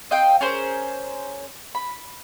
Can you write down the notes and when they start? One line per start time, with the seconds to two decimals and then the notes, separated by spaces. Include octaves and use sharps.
0.11 C4 D#5 F5 G5
0.41 C#4 G#4 A#4 C5
1.75 B5